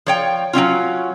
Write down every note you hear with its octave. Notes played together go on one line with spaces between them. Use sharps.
F3 C#5 G5
F#3 C4 C#4 F4